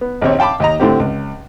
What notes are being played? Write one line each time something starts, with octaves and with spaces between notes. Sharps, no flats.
B3
A#1 D#2 C4 C#5
F5 G5 A5 B5 D6
D#2 D#5 A#5
A2 D3 C4 G4
C#2